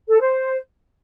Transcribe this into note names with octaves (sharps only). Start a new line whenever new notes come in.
A4
C5